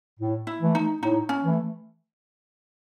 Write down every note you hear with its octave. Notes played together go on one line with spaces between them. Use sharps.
A2
E4
E3 A3
D#4
A2 D#4
C#4
E3 A3